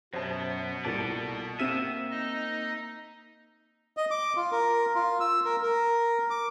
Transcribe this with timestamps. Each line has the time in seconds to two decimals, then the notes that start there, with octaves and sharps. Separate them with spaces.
0.13 F#2 B2 B3 C5 A5
0.85 C2 A#2 A4 D5 A5
1.60 A#3 C4 E5 D#7
2.11 D#4 D#5
3.97 D#5
4.11 D6
4.36 F4
4.52 A#4
4.95 F4
5.20 E6
5.45 A#4
5.62 A#4
6.30 D6